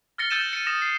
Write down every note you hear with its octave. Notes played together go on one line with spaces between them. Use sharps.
F6 A6 A#6 C#7 G7
E6 G6 A6 D#7 E7
C#7 D#7
D#6 A#6 E7
C7 D#7